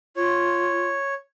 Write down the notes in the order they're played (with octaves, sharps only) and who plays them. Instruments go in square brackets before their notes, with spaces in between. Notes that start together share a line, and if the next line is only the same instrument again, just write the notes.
[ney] F4 [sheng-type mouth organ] C#5